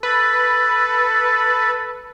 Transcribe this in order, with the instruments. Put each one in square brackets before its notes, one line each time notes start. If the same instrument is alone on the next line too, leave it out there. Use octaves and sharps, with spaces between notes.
[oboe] A4 [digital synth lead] B4